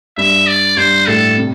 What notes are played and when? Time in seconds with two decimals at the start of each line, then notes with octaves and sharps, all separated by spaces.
0.18 G2 E5
0.47 D5
0.77 G2 C5
1.06 A2 A4
1.37 C3